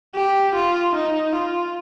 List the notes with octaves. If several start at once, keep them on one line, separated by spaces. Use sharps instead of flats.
G4
F4
D#4
F4